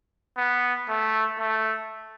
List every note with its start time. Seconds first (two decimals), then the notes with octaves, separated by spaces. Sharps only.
0.38 B3
0.89 A3
1.40 A3